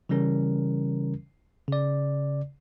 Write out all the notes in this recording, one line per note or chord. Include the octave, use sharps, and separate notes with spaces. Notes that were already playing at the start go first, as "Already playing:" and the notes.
C#3 E3 G3 C#4 A#4
C#3 D5